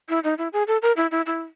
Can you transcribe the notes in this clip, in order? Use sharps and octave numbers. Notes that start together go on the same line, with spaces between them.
E4
D#4
E4
G#4
A4
A#4
E4
E4
E4